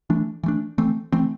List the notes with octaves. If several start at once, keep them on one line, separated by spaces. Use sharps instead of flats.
E3 A3 D4
E3 A3 D4
E3 A3 C4
E3 A3 C4